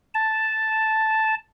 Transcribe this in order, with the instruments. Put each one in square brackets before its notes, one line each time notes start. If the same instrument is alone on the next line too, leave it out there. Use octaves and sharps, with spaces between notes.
[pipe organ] A5